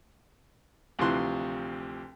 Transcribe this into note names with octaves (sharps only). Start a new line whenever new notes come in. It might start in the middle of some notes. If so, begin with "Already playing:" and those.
D2 C3 E3 F3 C6 F#6